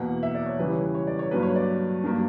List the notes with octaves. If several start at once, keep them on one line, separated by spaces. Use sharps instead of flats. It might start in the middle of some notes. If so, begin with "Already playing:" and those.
Already playing: E2 B2 A#3 F#5
E5
D5
C#5
E2 C#3 E3 G3 B4
C#5
B4
C#5
D5
C#5
G2 F#3 A#3 B4
C#5
D5
G2 F#3 A#3